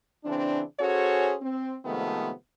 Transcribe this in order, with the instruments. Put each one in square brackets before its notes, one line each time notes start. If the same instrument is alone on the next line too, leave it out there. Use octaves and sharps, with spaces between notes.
[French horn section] C#3 E3 C4 D4
C#4 F#4 G#4 A4 C5 C#5
C4
C3 D#3 F3 G#3 A3 B3